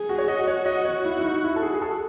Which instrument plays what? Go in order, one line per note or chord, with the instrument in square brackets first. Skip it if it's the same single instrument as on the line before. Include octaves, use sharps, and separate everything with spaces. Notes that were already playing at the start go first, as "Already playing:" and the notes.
Already playing: [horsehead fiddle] G#4
[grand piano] F#4
C#5
[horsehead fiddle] F#4 [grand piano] D#5
[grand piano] C#5
D#5
C#5
E4
E4
D#4
E4
A4
G#4
G#4
A4